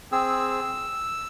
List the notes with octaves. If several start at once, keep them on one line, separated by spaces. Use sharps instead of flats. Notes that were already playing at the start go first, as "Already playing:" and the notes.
C4 G#4 E6